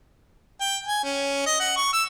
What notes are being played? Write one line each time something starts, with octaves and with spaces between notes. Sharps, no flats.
G5
G#5
C#4
D#5
F#5
C#6
E6